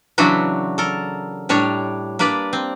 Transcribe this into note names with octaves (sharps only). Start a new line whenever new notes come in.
C#3 E3 F#3 D4 E4 F#4
A4 A#4
A2 G3 D4 C#5 A#5
A#3 D4 B4 D5
C4